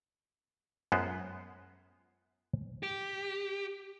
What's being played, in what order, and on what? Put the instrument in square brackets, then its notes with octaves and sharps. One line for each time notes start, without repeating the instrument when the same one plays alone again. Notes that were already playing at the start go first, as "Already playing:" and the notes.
[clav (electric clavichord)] F#2 G#3 B3 F4 C5
[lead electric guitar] G4